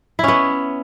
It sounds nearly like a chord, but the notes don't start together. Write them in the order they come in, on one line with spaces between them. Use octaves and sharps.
E4 C#4 B3